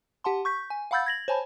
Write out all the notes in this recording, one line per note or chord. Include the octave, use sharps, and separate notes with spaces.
G4 F#5 A5 C6
C#6 G6 B6
G#5
F5 F#5 B5 E6 G6 A6
G#6 A#6 F#7
C5 C#5 G#5 A5 B5